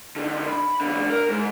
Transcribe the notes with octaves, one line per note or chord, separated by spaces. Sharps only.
D3 D#3
B5
E2 D3
A#4
G#2